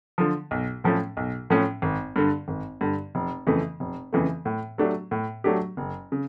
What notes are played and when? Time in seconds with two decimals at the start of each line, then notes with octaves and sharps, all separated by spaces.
0.18 D3 F3
0.51 B1
0.84 A2 F3 A3 C#4
1.17 B1
1.50 A2 F3 A3 C#4
1.82 G#1
2.16 G2 D3
2.48 G#1
2.81 G2 D3
3.15 F1
3.47 F2 C#3 E3 A3
3.80 F1
4.12 F2 C#3 E3 A3
4.45 A2
4.78 F#3 A3 D4 G4
5.11 A2
5.44 F#3 A3 D4 G4
5.77 F#1
6.12 C#3